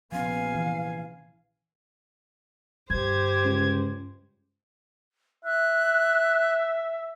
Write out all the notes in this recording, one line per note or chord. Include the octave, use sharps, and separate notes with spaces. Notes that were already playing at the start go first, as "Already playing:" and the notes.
A#1 C3 F3 B3 C#4 F5 G#5
E3
G2 D3 G4 C5 G#6
C#2
E5 F#6